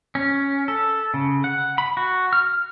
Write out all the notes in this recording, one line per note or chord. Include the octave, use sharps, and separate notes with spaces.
C#4
A4
C#3
F#5
B5
F#4
F6